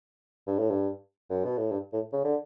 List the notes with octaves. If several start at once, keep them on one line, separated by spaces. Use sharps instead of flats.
G2
A2
G2
F#2
B2
A2
G2
A2
C#3
D3